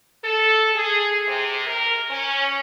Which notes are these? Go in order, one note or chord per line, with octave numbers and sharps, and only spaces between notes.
A4
G#4
C3
A#4
C#4